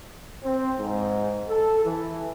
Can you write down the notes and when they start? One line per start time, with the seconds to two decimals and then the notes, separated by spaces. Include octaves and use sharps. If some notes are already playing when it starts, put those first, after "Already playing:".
0.43 C4
0.78 G#2
1.48 A4
1.83 E3